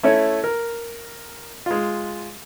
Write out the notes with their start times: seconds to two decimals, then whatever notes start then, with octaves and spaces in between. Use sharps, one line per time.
0.03 A3 C#4 E4 C#5
0.44 A#4
1.66 G#3 F4